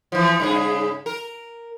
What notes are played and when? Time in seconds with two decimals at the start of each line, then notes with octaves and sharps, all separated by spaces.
0.12 E3 F3
0.40 G2 C#3 G#4
1.06 A#4